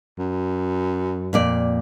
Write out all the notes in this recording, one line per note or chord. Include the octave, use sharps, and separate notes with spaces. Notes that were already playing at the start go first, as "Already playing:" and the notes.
F#2
F2 A#2 D5